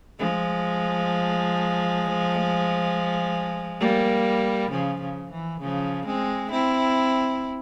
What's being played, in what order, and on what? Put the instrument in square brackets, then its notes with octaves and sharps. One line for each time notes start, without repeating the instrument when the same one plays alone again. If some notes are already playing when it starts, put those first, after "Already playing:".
[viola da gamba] F3 G#3
G3 A#3
C#3 F3
C#3
E3
C#3 F3
G#3 C4
C4 E4